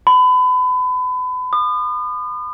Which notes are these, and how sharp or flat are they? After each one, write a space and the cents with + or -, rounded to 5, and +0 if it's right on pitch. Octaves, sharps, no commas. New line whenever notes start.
B5 +35
D#6 -40